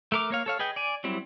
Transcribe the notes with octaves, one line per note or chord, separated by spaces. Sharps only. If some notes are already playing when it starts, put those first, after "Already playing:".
A3 A#4 D6
A#3 C#5 F5
A4 C#5 F5
G#4 B4 D#5 G5
D5 G#5
F#3 G3 C4 E4